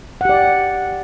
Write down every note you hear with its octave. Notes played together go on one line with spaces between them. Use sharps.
G4 D5 F#5